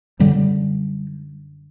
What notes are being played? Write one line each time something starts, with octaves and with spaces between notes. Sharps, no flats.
F#2 D3 G3